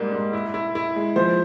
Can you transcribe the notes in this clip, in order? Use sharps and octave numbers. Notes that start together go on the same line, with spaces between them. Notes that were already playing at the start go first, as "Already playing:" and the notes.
Already playing: G#2 G3 A#3
G#2
E4
E4
E4
G#3
F3 C5